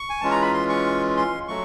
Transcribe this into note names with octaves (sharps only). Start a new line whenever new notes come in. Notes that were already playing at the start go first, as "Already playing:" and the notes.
Already playing: C#6
G#5
E3 G#3 C#4 F4 A5
A#5
B5
C6
C#6
C6
F#3 A3 C#6